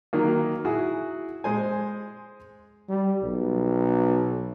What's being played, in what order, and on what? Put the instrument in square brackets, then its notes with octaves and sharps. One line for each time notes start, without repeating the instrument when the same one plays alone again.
[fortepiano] D#3 F#3 A#3
E4 F#4 G#4
G#3 C5 G#5
[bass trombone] G3
B1